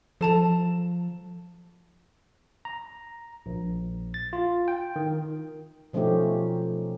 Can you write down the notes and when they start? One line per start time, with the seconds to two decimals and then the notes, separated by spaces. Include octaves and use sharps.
0.21 F3 A4 A5 A#5
2.65 A#5
3.46 A#1
4.14 A6
4.33 F4
4.68 G5
4.96 D#3
5.93 B2 F3 A3 C#4 D#4 G4